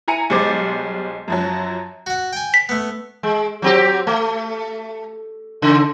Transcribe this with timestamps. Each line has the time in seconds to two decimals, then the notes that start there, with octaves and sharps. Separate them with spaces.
0.08 E4 G#5 A#5 C#7 D#7
0.30 B1 G3 G#3 C5 D6 A6
1.28 F#2 F3 F#3
2.06 F#4 F#5
2.33 G5 G#5
2.54 B6
2.69 A3 B3
3.23 G#3
3.62 F#3 C4 G4
4.07 A3
5.62 C#3